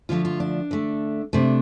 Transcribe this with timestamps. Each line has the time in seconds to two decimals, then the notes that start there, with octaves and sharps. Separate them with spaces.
0.09 D3 F3 A3 F4
0.25 F4
0.40 D4
0.71 D3 A3
1.33 C3 A3 D4